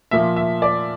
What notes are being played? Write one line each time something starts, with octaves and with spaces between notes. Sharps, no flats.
A#2 F3 A#3 E5
E5
D5